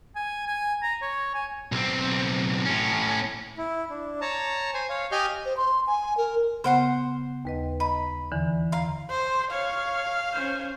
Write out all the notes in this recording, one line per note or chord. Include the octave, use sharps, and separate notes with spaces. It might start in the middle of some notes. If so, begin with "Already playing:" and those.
G#5
G#5
A#5
C#5
G#5
B1 C4
A2 C#4
E4
D4
C#5 A5 A#5
C5 G#5
C#5 F5
G4 D#5 G#5 F6 G6
C5
C6
G#5
A#4
C#3 B3 C5 F#5 C6
D#2 B4 D#5
D#5 A#5 B5
E2 D3 E3
F5 A#5 C6
C5
C#5 F5
C#4 C5